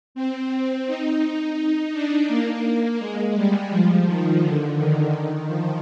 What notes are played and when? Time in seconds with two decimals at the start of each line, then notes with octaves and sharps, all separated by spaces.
0.15 C4
0.87 D#4
1.93 D4
2.28 A#3
2.99 G#3
3.35 G3
3.70 F3
4.05 D#3
4.42 D3
4.77 D#3
5.48 F3